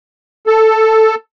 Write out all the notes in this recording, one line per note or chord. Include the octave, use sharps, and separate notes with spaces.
A4